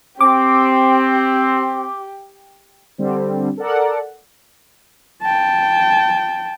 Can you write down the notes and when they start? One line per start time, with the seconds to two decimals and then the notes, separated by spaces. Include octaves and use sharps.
0.21 C4 G4 D6
2.98 D3 G3 C4
3.57 A4 A#4 D5 F#5
5.23 G5 A5